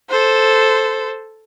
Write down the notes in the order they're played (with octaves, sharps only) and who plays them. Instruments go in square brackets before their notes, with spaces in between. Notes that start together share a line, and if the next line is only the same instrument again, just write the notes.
[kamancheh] A4 C5